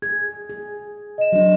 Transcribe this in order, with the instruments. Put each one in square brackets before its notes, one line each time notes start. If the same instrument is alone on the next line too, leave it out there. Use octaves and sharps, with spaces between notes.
[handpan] G#4 [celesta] G#6
[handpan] G#4
[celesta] D#5 E7
[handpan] F#3 D4